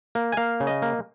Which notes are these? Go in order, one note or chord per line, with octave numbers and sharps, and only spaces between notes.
A#3
G#5
A#3 F5
C#3
D#5
A#3